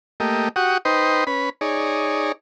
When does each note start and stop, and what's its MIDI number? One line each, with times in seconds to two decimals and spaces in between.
0.20 0.49 57
0.20 0.49 58
0.20 0.49 67
0.20 0.49 75
0.56 0.78 66
0.56 0.78 67
0.56 0.78 78
0.56 0.78 85
0.56 0.78 87
0.85 1.24 63
0.85 1.24 71
0.85 1.24 72
0.85 1.24 75
0.85 1.24 79
0.85 1.24 84
1.27 1.49 61
1.27 1.49 71
1.27 1.49 83
1.61 2.32 63
1.61 2.32 68
1.61 2.32 73
1.61 2.32 74